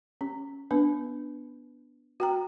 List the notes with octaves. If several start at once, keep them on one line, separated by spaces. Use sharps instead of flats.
C#4
B3 D4 B4
F#4 G5 A#5